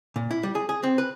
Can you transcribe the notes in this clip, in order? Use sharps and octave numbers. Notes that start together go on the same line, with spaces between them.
A#2
E4
G3
G#4
G#4
C4
B4